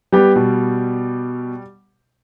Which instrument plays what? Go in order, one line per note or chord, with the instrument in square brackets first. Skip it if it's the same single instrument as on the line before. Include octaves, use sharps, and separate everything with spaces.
[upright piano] G3 [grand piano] B3 G4
[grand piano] B2